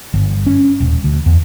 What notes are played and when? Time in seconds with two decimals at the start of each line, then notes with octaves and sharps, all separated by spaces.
0.14 G1
0.47 C#4
0.80 D#1
1.04 D2
1.26 E2